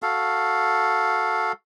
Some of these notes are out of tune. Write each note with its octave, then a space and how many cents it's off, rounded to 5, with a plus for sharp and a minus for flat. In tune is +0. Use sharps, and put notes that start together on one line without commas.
F#4 -5 A4 +0 F5 +0